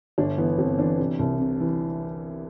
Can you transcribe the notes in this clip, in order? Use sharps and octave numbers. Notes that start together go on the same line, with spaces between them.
G1 D4
E3 B3
G1 C4
E3 D4
C3
C2
C3
E3